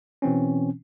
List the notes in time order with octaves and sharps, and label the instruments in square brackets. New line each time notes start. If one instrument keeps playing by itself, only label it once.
[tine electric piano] B2 E3 C4 C#4